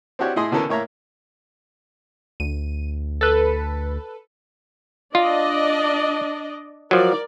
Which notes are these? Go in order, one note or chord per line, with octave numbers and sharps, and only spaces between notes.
C4 D4 E4 F#4 G4 C#5
A2 E4 G#4 D#5 C6
B2 D3 E3 C#4 A4 A#4
A2 A#3 C#5 E5 A#5
D2 D#7
A4 B4
D4 F4 D5 D#5
F3 F#3 A#4 D5